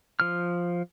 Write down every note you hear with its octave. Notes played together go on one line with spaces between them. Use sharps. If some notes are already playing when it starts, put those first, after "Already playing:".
F3 F6